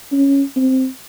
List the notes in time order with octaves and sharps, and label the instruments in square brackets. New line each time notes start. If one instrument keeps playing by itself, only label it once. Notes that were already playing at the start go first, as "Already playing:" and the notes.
[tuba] C#4
C4